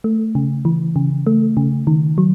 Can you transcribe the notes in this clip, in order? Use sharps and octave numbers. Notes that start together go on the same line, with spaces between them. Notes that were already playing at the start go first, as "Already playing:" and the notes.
A3
C#3
E3
C#3
A3
C#3
D#3
F#3